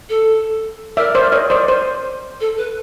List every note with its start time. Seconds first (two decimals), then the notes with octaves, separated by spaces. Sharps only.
0.09 A4
0.97 A#4 D5 E5
1.15 C5 D5
1.32 C#5 D#5
1.50 C5 D5
1.68 C5
2.40 A4
2.57 B4